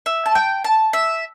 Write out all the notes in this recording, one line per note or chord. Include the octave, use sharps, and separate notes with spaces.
E5
A5
G5
A5
E5